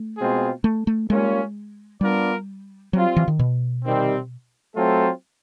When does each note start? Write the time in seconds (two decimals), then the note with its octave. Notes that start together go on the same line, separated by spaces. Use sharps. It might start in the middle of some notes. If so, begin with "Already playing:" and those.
Already playing: A3
0.18 B2 G#3 C4 F4 G#4
0.64 A3
0.87 A3
1.10 G3 G#3 A#3 C#4 F4
2.01 G3 B3 D4 F4 A#4 D5
2.93 F#3 G3 C4 F4
3.16 E3
3.28 D#3
3.39 B2
3.85 C3 D#3 G3 C4
4.76 F#3 A3 C4 F4 A4